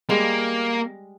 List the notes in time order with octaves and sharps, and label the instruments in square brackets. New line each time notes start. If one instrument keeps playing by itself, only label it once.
[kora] G3 G#3 G#4 [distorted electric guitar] A#3